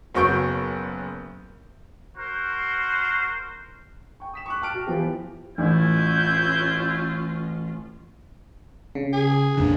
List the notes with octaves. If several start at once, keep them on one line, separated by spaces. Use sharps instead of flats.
F#1 F#3 B3 C#6 G6 D7
F#4 A#4 C5
G5 C#6
D#6 B6 E7
C#6 D6 F#6
G5 A5 F6 D7
F#4
E3 F3 B3 F4 G4
A1 C#4 E4 F4 G6
C#3
G#4
A#1 F2 D3